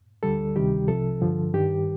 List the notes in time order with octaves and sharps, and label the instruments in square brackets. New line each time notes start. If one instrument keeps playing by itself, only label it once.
[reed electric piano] D2 D3 G3 A4
D2 C3 D#3 G3 G4
C2 C3 F3 A4
G2 D3 F3
G2 D#3 G3 G4